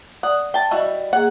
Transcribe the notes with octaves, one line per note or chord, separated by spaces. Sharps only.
D5 F#5 D#6
G5 A5
G3 E4 F#4 D#5
A#3 G#4 F#5